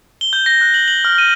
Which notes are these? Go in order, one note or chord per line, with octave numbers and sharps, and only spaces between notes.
G7
G6
A#6
F#6
F#7
F#7
F6
D#7